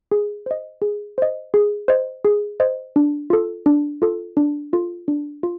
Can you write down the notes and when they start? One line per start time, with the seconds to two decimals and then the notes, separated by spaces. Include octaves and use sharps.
0.12 G#4
0.46 C5 D#5
0.82 G#4
1.18 C5 D#5
1.54 G#4
1.88 C5 D#5
2.25 G#4
2.60 C5 D#5
2.96 D4
3.30 F4 A4
3.66 D4
4.02 F4 A4
4.37 D4
4.73 F4 A4
5.08 D4
5.43 F4